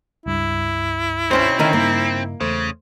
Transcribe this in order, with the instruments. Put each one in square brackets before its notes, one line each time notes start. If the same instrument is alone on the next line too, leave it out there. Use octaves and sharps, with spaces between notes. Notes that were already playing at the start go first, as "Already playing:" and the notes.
[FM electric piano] C#2 G2 [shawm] E4
[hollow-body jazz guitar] B1 C#4 C5 [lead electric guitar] C4
[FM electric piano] D3 [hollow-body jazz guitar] D#3 C#4 D#4
[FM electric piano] G2 C#3 D#4 [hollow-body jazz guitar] A#3
[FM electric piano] E2 A3 C5 [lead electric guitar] C#3